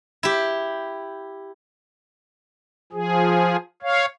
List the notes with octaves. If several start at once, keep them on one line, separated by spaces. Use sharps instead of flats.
E4 G4
F3 G#4
C#5 F5